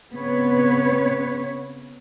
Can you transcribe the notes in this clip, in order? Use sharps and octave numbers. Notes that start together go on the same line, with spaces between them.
C#3 B3 C4 B4 C#5